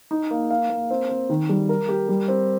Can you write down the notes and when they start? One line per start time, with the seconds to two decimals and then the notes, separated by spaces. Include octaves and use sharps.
0.11 D#4
0.31 A#3
0.50 F5
0.70 A#3
0.90 C4
1.09 C4
1.29 D#3
1.49 G3
1.69 A#4
1.89 G4
2.08 G3
2.28 C4